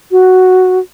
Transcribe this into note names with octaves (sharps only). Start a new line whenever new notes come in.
F#4